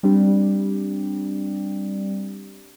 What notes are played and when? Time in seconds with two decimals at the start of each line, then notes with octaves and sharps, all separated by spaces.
0.03 G3 C4 D4 G4